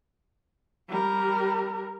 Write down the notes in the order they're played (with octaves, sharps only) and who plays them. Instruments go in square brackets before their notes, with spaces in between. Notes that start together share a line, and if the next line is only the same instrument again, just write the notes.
[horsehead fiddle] G3 A#4